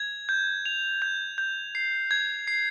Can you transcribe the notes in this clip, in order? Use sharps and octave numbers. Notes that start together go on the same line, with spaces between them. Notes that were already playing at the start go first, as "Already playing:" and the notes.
Already playing: G#6
G6
F7
G6
G6
C7
G#6
C7